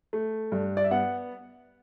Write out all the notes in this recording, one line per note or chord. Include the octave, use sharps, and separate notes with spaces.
A3
G2
D5
E5
B3 F#5